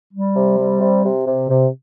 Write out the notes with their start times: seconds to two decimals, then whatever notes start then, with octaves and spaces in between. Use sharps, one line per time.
0.13 G3
0.36 C3
0.58 G3
0.80 C3
1.04 C3
1.26 C3
1.48 C3